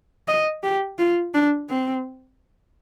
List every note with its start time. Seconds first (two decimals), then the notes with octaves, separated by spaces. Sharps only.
0.28 D#5
0.63 G4
0.99 F4
1.34 D4
1.70 C4